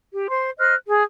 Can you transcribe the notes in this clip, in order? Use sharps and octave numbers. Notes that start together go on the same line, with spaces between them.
G4
C5 C6
C5 D#5 F6 F#6
G#4